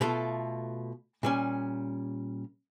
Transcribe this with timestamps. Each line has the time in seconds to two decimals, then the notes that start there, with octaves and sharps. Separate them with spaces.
0.01 B2 A3 F4 A4
1.23 A#2 G3 C#4